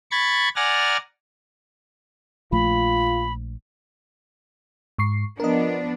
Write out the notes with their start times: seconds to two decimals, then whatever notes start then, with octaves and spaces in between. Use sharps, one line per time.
0.11 B5 C#6 G#6 A6
0.56 D5 F#5 G#5 A#5 F6 A6
2.52 A#1 F3 A3 F4 B5
4.98 G#2 C#6 C7
5.40 F3 B3 D4 A#4 D#5